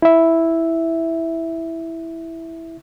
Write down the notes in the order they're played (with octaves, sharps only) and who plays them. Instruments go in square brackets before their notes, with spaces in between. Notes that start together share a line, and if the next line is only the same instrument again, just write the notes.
[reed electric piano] E4 E5